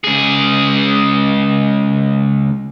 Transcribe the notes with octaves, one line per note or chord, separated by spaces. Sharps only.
C#2 G#4